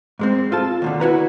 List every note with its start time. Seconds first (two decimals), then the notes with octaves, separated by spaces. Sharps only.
0.19 G#2 G#3 C4
0.52 F4 A4 A5
0.82 D#2 B2 D3
1.00 E4 F#4 B4 A#5